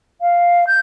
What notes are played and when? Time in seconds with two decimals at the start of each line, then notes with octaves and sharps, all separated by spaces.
0.21 F5
0.67 G6